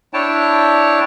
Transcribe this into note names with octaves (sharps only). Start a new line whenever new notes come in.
D4 E4 C#5 G5 A5